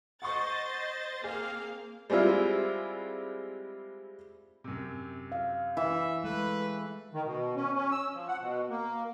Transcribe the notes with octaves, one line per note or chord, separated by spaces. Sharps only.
C5 D#5 F#5 C6 C#6 A6
A#3 C4 G#4 F5
G3 G#3 C4 E4 F4
F#2 C3
F5
E3 E5
G#3 A3 B4
D#3
B2
C#4
C#4
E6
F3
F#5
B2
A#3